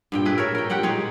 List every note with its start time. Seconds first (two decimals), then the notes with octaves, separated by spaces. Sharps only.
0.12 G2 A#2 G5
0.25 A3 E4 G#4 B4
0.38 A#4 C#5 E5
0.55 A#4 G5
0.70 A#2 G4 F#5 G5
0.83 G#3 D#4 C#5